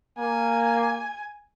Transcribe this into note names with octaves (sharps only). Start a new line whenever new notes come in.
A#3 G#5